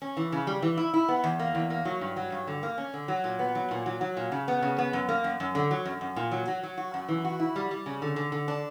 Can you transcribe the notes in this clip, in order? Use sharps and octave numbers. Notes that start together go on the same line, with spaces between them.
C#4
E3
C#3
G3
E3
E4
E4
B3
E2
A#3
E2
A#3
F#3
G2
F#3
G2
D3
A#3
C#4
D3
F#3
A#2
B3
F#3
A#2
F#3
F#3
A#2
C#3
B3
C#3
B3
F#2
A#3
F#2
F#2
D3
F#3
F#2
F#2
A#2
F#3
F#3
F#3
F#4
F#2
E3
F#4
E4
G3
G3
C#3
D3
D3
D3
D4